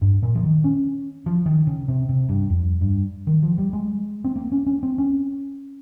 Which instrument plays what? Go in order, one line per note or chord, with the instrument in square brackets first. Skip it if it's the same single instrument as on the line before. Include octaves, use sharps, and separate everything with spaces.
[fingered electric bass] G2
A#2
F3
D#3
C#4
F3
D#3
C#3
C3
C3
G2
F2
G2
D#3
F3
G3
G#3
C4
A#3
C#4
C#4
C4
C#4